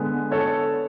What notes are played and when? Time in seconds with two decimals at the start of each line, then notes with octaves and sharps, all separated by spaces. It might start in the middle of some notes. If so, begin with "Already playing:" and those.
Already playing: D3 G#3 B3
0.31 A4 C#5